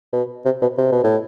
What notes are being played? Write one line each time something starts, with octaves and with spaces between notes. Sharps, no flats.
B2
C3
B2
C3
B2
A2